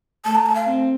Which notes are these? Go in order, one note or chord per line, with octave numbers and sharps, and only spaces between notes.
A3 A5
A#5
A5
F5
C4